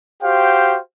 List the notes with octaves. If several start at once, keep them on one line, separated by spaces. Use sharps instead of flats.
F#4 G4 C5 F5 G5